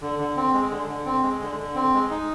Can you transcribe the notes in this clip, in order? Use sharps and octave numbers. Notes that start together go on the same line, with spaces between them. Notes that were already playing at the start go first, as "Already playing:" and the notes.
D3
D3
C4
G#3
D3
D3
C4
G#3
D3
D3
C4
G#3
D#4